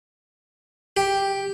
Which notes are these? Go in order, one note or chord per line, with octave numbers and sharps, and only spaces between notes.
G4